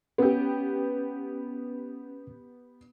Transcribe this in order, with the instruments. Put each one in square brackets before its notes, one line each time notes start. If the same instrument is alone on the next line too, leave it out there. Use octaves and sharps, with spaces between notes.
[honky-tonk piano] B3 G4 [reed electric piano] C#4